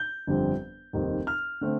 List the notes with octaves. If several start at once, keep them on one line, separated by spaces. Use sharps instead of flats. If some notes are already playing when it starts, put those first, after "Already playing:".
Already playing: G6
G1 F2 D3 G3 C4
F1 D#2 D#3 G3 C4
F6
D3 A3 C4